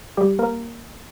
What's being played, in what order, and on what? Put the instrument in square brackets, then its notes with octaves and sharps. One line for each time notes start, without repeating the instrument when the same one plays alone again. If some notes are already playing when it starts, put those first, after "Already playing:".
[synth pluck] G3 G4
A#3 A#4